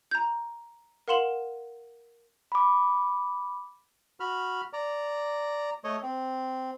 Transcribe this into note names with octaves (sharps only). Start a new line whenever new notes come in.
A#5 G6
A#4 F5 F#5 C6 E7 F#7
B5 D6
F#4 B5 F6
D5 A#5
A3 C#5 D#5
C4